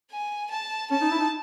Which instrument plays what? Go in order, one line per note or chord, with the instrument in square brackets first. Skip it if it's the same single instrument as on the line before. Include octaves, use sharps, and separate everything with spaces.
[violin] G#5
A5
[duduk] C#4 [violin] A5
[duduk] D#4
E4
D#4